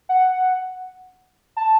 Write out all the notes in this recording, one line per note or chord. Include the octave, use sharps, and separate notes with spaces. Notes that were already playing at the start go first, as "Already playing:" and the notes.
F#5
A5